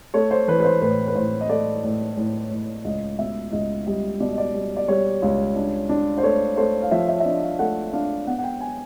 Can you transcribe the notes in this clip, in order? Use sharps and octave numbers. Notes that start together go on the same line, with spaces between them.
A3 C#5
C5
E3 B4
B4
C5
A2 B4
B4
A2 C5
D#5
A3 D5
A2
A2
A2
C#2 D#5
B2 E5
C#2 D#5
G3 D#5
B2 D5
D#5
D5
G3
D5
G3 C#5
C#2
D4
D4
C5
A3 C#5
A3 C5
F5
F3 E5
E5
E5
D4 D#5
F5
A3 F#5
D4 F5
B3 F#5
F#5
G5
G#5